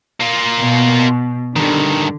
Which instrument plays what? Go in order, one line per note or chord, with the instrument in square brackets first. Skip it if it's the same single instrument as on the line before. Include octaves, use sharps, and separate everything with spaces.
[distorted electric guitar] A#3 F4
[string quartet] B2
[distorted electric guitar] G2 D#3 [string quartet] D3